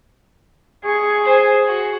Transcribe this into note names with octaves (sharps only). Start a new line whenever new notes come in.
G#4 C#6
C5 G#5
F#4